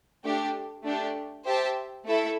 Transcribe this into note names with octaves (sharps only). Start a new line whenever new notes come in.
A3 D4 G4
A3 D4 G4
G4 C5 E5 A5
A3 E4 A4 E5